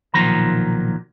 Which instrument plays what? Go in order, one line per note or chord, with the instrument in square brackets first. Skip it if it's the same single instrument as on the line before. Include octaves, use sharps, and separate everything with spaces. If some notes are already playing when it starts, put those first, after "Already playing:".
[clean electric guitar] B1 A#2 D#3 F3 F#3 A#5